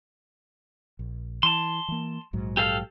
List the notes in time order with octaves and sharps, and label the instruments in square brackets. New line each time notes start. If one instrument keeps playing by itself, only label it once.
[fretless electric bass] A#1
[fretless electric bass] E3 [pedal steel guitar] A5 C6
[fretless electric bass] E3 A#3
A#1 G#2 F#3
[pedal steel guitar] G4 A4 F5